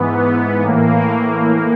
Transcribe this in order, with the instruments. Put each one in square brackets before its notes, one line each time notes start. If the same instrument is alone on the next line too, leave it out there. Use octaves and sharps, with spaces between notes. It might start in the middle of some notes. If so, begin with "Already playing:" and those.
Already playing: [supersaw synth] G#2 E3 B3
B3
A2 E3 A#3